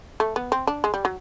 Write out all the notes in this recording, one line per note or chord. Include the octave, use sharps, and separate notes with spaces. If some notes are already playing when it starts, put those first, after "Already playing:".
A3
B3
C4
D4
G#3
G3
F#3